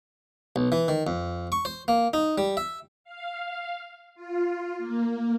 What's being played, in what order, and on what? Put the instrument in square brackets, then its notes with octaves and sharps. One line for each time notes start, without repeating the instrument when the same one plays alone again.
[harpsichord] B1
E3
D#3
F2
C#6
C5
A#3
D#4
G3
E5
[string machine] F5
F4
A#3